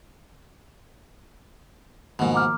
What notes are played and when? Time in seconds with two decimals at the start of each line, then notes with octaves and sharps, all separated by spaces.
2.19 G#2 B2 D#3 F3 A#3
2.34 A#5 D6 F6